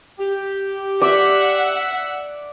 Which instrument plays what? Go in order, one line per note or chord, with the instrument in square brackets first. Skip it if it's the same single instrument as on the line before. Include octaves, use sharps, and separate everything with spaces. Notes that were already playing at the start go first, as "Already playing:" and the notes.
[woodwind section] G4
[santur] D5 [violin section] E5 F#5